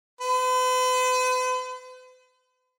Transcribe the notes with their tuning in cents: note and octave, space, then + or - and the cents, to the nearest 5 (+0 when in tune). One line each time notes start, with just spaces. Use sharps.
B4 +45